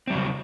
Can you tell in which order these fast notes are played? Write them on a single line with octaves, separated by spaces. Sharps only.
C4 G3 F#3 C#3